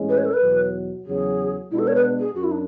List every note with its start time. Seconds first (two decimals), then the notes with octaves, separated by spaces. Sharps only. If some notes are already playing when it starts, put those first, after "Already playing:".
Already playing: A1 A2 G#3 C#4
0.09 B4
0.18 C#5
0.25 A4
0.33 B4
0.41 E2 B2 F#3
1.06 E2 C#3 F#3 G#4
1.71 B2 G#3 B3 D4 E4
1.79 A4
1.87 C#5
1.95 B4
2.19 G#4
2.35 F#2 F#4
2.43 E4
2.52 D4